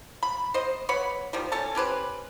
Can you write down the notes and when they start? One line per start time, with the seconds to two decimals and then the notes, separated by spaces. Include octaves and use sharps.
0.23 B5
0.54 C5 D#5
0.89 B4 C#5 F#5 B5
1.33 D#3 F3 G3
1.52 C#4 A4 A5
1.75 C#4 G4 B4 C5